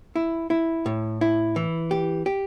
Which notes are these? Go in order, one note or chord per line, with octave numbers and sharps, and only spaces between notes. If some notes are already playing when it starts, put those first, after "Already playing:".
E4
E4
A2
E4
E3
G4
G4